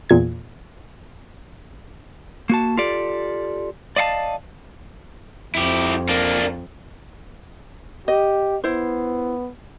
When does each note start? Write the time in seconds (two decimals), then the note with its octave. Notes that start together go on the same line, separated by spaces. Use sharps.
0.09 E2 A#2 G#6
2.49 A#3 F#4 A5
2.77 F4 G4 A4 D5
3.96 D5 D#5 F5 F#5 A5
5.55 F2 E4 G4
6.09 A#3 D4
8.08 G4 D#5
8.64 B3 E4 C5